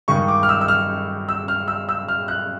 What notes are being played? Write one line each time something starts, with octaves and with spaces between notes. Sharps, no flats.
G2 D#3 G#3 C#6
D6
F6
E6
E6
F6
E6
F6
E6
E6
F6
F#6